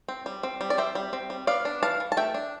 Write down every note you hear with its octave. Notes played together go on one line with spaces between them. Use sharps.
C4
G3
C4
G3
D5
C4 C5 E5
G3
C4
G3
B3 D5 F5
D4
E3 F5 A5
E3
A5
A3 E5 G5
D4